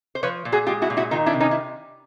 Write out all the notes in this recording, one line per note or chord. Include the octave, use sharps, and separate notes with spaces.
C5
F3 B4 C#5
A#2
F#4 G#4
G#3 F4 G4
E4 F#4
A#2
E4 F#4
D#3 D#4 F4
D4 E4
C3
C#4 D#4
E4